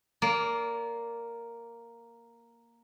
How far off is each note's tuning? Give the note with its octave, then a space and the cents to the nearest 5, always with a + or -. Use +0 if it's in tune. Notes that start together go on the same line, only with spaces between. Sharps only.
A#3 +0 D5 -35